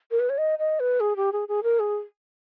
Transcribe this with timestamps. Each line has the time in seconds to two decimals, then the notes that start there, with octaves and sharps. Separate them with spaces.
0.11 A#4
0.20 B4
0.30 C#5
0.38 D#5
0.59 D#5
0.80 B4
1.00 G#4
1.16 G4
1.33 G#4
1.48 G#4
1.63 A#4
1.80 G#4